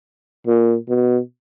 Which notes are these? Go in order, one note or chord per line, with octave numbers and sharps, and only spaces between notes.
A#2
B2